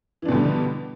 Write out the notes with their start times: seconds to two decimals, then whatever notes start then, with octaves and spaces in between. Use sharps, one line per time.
0.22 E3
0.25 D4
0.29 B2
0.32 D3
0.35 G3